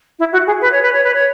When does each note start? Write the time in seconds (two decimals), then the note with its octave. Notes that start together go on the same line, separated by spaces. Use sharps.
0.19 E4
0.32 F#4
0.47 G#4
0.61 B4
0.71 C#5
0.82 B4
0.92 C#5
1.04 B4
1.14 C#5